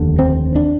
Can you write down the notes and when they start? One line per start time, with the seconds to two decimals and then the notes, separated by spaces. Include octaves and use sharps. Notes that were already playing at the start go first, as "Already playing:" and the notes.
Already playing: F1 D#2 D3
0.19 C4
0.55 D4